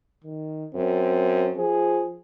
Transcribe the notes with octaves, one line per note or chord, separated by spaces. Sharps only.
D#3
F#2 C4
F3 G#4